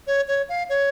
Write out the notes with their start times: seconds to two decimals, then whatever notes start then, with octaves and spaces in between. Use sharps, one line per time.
0.07 C#5
0.28 C#5
0.49 F5
0.69 C#5